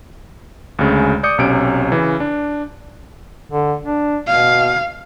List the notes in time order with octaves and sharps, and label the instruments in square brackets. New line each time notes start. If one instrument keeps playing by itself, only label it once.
[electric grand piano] D2 C#3 G#3
D5 D6 D#6 G6 C#7
B1 C3 C#4 D7
C#3 E3
D4
[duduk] D3
D4
[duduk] B2 [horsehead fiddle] F5